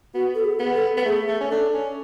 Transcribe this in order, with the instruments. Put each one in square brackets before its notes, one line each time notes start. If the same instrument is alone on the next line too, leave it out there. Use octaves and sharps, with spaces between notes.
[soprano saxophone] B3 [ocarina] F#4
[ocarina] A4
G#4
[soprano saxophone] B3
[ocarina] A4
[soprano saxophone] B3
[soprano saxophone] A3 [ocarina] G#4
[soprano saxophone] A3
C#4
[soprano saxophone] D4 [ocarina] A4
[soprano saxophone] C#4